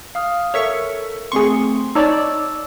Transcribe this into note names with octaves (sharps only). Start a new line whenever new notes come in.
F5 D#6 F6
A4 A#4 C#5 E5 C#6
A3 C4 G#4 C6 C#6
D#4 C#5 D5 A5 D6 E6